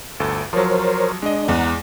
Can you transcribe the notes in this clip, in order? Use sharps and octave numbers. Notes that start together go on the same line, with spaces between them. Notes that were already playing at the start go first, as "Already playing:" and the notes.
G1 D2 A4
F3 F#3 A#4 C5 C#5
G#3 D4 D#5
E2 F#5 A#5